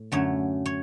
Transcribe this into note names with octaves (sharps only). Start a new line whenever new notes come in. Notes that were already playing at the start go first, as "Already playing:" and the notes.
Already playing: A2
F#2 D3 A3 C#5
C#5